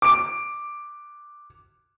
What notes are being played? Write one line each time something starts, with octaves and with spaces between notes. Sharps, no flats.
D6 D7